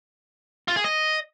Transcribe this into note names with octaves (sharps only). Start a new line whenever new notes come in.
F4
G#4
D#5